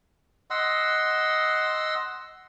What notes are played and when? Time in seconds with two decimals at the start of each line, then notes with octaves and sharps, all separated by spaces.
0.50 D#5 F#5 C6 E6